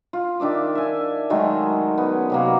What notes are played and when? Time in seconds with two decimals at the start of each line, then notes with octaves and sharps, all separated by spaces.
0.13 F4
0.40 D#3 D4 E5 D6
0.75 E5 G#5
1.30 D#3 F#3 G#3 A3
1.98 B3 C#4
2.30 C3 F#3 A#3